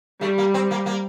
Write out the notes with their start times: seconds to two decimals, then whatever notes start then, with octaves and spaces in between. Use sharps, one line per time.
0.21 G3 A3
0.38 A#3
0.54 C4
0.71 A#3
0.86 A#3